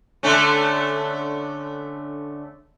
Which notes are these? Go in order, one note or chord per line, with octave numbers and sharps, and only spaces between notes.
D3 A3 C#4